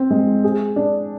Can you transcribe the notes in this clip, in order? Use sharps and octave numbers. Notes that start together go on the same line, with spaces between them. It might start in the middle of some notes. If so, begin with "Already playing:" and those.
Already playing: C4
G#3
G#4
D4